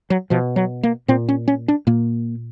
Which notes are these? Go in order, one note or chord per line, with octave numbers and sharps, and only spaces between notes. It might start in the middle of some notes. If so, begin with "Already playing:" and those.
F#3
B2 F3
F#3
A#3
A#2 C4
C#4
C#4
D4
A#2 A#3